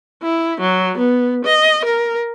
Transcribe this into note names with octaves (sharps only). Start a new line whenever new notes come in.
E4
F#3
B3
D#5
A#4